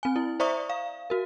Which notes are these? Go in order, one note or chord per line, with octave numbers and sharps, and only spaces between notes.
C4 G#5
E4
C5 D5 E5 A#5 C#6 D#6
F5
F#4 A#4